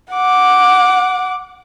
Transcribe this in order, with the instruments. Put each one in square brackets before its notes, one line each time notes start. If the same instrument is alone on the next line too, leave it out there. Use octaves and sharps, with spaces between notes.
[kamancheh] F#5 D6